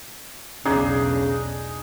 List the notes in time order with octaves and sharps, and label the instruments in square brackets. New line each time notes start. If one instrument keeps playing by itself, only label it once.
[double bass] B1 E2 [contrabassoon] C#3 [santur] D4 D#4 G#4